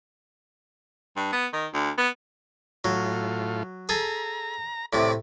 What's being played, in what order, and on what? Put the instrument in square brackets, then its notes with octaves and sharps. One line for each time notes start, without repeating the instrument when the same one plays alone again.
[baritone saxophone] G2
B3
D#3
D2
B3
[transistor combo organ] A2 F4 [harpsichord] F#3
[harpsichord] G#4 A4 [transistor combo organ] A#5
[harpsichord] A2 C3 [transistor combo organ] D5 D6